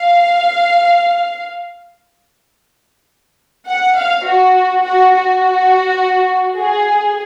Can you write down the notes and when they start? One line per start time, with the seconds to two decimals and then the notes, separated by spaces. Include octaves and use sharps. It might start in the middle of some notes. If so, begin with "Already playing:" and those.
Already playing: F5
3.68 F#5
3.97 F5
4.26 F#4
4.84 F#4
5.13 F#4
6.58 G#4